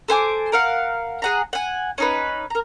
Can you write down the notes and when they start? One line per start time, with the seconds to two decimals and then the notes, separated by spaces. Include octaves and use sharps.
0.08 A4 C5 G#5 D6
0.52 A#4 F5 F#5
1.22 G#4 F#5 A#5
1.53 F#5 G#5
1.98 C#4 D#4 B4
2.50 A#4 A#5